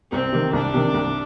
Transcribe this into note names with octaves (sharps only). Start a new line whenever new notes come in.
C2 C4
C3 D#3
C2 D4
C3 D#3
C2